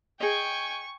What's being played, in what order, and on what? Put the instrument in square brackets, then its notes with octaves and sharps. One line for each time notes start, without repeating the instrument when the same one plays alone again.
[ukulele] G#4 D#5 [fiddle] G5 G#5 [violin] C#6